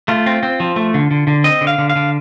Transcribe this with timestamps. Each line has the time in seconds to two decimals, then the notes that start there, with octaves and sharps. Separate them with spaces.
0.08 A3 F4
0.26 C4
0.43 C4
0.60 F3
0.76 A3
0.94 D3
1.11 D3
1.27 D3
1.44 C4 D#5
1.61 D3
1.67 F5
1.78 D3
1.90 F5
1.96 D3